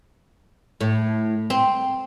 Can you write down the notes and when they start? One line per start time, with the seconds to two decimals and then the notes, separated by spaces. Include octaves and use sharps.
0.81 A2
1.50 C4